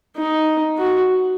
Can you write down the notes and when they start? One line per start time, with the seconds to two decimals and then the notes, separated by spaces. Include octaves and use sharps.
0.17 D#4
0.78 F#4